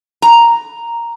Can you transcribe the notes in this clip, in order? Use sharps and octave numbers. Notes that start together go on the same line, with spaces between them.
A#5